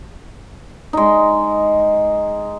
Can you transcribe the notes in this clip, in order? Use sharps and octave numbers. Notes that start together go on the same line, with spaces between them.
G#3 D#4